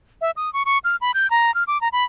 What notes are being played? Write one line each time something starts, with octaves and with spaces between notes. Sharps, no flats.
E5
D#6
C#6
C#6
F6
B5
G6
A#5
F6
D6
A#5
B5